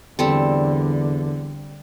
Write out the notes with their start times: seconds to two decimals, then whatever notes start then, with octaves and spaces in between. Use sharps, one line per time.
0.19 E2 D3 G3 C4 A4